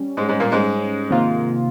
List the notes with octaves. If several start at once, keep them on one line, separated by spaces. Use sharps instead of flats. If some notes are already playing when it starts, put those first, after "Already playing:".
Already playing: G3 C#4
G#2 G#3
G#2 G#3
A#2 A#3
G#2 G#3
C3 D#3 A#3 F4